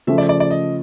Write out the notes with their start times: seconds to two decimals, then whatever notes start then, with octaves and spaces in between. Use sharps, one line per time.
0.07 C#3 F3 A3 C#4 E5
0.18 D5
0.29 D5
0.40 D5
0.51 D#5